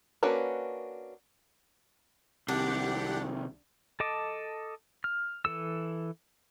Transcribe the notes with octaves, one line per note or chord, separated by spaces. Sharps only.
A#3 C#4 D4 F#4 B4
C2 C3 D#3 D4 G4 F#5
A4 D#5 A5 D6
F6
E3 A4 E6